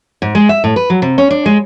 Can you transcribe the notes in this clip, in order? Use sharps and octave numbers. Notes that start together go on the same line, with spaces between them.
G#2
G#3
E5
A2
B4
F#3
C3
C#4
D4
G#3